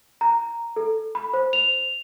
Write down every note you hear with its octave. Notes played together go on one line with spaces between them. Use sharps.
A#5
A4
B5
C5
F7